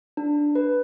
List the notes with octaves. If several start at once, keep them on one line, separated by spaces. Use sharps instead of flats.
D4
B4